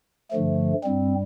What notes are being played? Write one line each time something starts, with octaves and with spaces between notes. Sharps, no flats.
G2 D3 F3 A3
G2 G3 C4